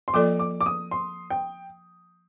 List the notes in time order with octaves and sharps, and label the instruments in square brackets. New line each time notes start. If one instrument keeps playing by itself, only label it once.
[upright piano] C6
[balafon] F3 A#3 F4 A4 D5 [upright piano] D6
[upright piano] D6
D6
D#6
C6
G5